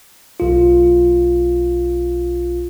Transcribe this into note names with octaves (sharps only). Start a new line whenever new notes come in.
B1 F4